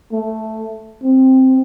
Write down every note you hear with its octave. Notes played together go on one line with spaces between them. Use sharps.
A3
C4